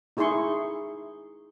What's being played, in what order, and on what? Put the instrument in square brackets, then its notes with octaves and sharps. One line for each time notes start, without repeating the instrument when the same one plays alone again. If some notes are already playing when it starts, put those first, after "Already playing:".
[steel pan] D#4 E4 G#4 E5 C6 C#6